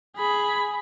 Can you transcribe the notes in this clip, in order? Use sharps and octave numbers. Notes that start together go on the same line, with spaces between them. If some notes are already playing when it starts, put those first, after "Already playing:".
G#4 B5